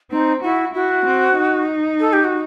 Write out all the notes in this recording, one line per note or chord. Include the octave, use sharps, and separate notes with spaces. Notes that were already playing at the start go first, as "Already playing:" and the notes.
C4 D#4
E4 F#4
E4 F#4
C4
D#4
A4
G4
F#4